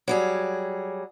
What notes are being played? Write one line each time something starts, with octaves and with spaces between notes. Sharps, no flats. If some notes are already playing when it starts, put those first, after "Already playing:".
F#3 G3 G#4